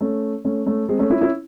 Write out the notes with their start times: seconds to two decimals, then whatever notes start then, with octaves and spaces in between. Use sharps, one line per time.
0.01 A3 C#4
0.45 A3 C#4
0.66 A3 C#4
0.89 G#3 C4
0.99 A3 C#4
1.10 C#4 E4
1.21 C#4 E4